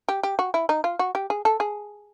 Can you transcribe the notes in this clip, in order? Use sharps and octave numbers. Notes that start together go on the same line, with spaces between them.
G4
G4
F#4
E4
D#4
F4
F#4
G4
G#4
A4
G#4